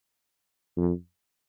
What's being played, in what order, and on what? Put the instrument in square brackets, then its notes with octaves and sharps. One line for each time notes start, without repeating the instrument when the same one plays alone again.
[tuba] F2